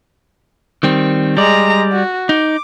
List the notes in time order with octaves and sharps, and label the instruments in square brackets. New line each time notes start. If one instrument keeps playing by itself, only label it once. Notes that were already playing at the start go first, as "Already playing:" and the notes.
[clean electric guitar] D#3 G3 C4
[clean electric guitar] G3 D5 [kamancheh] G#3 A#5
[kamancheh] F#4
[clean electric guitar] D#4 [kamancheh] D6